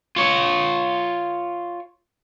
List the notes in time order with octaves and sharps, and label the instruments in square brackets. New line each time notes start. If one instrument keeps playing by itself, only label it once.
[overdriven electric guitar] F4 C#5